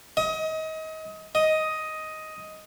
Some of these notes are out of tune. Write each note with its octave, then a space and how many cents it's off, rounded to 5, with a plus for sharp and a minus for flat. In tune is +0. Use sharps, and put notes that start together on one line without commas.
D#5 +30
D#5 +10